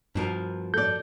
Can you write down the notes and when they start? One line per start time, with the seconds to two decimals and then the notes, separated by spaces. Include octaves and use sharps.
0.15 G2 B2 F3 A#4
0.74 A4 D5 G6